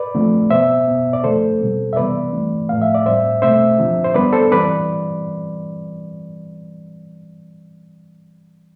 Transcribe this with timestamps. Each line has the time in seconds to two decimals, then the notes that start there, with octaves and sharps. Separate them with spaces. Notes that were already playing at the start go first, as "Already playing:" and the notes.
Already playing: B4 D5
0.14 D3 F3 A3 C4
0.50 B2 B3 C5 E5
0.87 B2 B3
1.13 D5
1.24 D3 F3 A3 A4 C5
1.60 B2 G3 C4
1.93 E5
1.96 C3 E3 G3 B3 B4 D5
2.33 E3 A3 C4
2.69 A2 F3 A3 F5
2.82 E5
2.94 D5
3.06 A2 G3 C4 C5 E5
3.42 B2 A3 C4 C5 E5
3.79 D3 F3 C4
4.05 C5
4.14 D3 G3 B3 B4 D5
4.33 A4 C5
4.51 E3 G3 C4 B4 D5